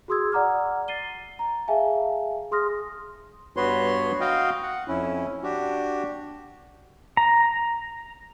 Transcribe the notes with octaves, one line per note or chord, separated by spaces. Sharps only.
F#4 G#4 C6 D#6 E6 G#6
D5 F#5 A#5 D6 F6
A6 C7 D#7 G7
A#5
G#4 E5 F5 G#5 A5
G#4 C6 D#6 F6 A#6
G2 B3 F#4 B4 C#5 C6
F#4 D#5 F5 G5
F#5
F2 C#4 E4
D4 F#4 G4
A#5